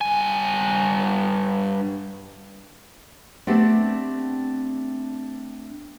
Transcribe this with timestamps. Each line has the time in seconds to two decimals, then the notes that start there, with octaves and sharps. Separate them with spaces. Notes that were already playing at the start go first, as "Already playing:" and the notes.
0.01 G2 G#5
3.47 A3 B3 C4 D4 G4